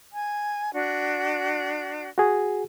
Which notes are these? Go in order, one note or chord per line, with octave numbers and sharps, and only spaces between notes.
G#5
D4 F#4
F#4 G#4